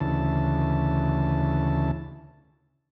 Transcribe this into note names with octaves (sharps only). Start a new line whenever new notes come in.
D2 C#3 E3 A5